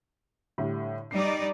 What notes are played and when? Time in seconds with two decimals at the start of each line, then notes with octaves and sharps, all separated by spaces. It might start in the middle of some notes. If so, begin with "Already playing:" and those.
0.58 A2 D3 G3
1.11 G3 D#4 D5 C7